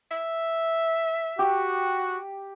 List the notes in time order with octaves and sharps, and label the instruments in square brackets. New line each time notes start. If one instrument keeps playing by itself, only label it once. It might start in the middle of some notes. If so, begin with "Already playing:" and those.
[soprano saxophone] E5
[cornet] F#4 [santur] G4